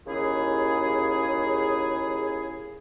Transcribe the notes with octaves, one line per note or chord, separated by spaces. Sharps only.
D#2 C#3 E4 G#4